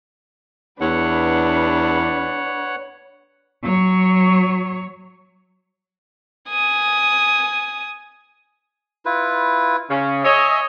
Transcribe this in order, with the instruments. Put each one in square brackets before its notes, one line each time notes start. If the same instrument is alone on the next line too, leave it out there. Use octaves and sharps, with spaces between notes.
[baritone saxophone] E2 [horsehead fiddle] D4 B4 [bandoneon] C#5 F#5
[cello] F#3 C#5
[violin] G#5 D#6
[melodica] E4 F4 B4
[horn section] C#3 C#4
[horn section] C#5 D#5 [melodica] E5 G#5